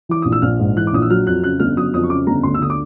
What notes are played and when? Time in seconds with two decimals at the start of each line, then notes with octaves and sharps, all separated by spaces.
0.09 E3 D6
0.22 A#1 D#6
0.32 E6
0.42 A#1 F6
0.59 G#2
0.76 E3 F#6
0.87 D6
0.93 A#1 D#6
1.02 E6
1.10 F#3 F6
1.27 F2 F#6
1.43 C#3 F#6
1.60 G1 F6
1.77 F#3 D#6
1.94 F2 D#6
2.04 C#6
2.10 C#3 D6
2.27 G1 A#5
2.43 D2 C6
2.54 E6
2.60 D3 D#6
2.70 D6